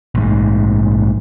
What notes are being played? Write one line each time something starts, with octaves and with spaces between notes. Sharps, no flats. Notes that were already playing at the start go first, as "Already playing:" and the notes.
A#1 G#2